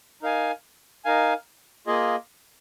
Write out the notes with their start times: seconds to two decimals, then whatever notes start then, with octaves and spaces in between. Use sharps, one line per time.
0.22 D#4 A#4 F5 G#5
1.05 D#4 A#4 F5 G#5
1.87 A#3 F4 G#4 D#5